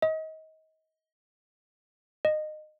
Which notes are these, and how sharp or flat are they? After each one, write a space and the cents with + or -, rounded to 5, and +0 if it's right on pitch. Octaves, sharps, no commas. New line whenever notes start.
D#5 +30
D#5 -20